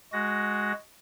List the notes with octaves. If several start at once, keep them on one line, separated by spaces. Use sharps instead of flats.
G#3 F#4 A#6